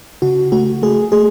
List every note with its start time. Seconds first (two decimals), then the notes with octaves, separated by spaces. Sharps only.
0.22 C#3 F#4
0.52 A3 F#4
0.82 A3 G#4
1.12 A3 G#4